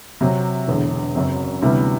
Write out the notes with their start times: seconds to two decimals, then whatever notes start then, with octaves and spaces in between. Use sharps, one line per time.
0.21 C3 F#3 C4
0.68 E1 E2 D3
1.15 F#1 F#2 F#3 C4
1.62 D2 C3 E3 G3 B3